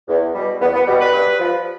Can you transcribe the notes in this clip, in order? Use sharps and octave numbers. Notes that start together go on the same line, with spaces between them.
E2
B2 G3
E2 B3
B3
B2 G3
B4
G2
F3